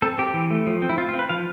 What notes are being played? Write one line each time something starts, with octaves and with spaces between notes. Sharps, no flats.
C4 A4
C4 G4
E3
A3
F3
C4
E4
C4 F4
F4
C4
B4
F3 F5